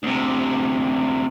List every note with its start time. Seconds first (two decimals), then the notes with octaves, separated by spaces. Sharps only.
0.03 D2 C3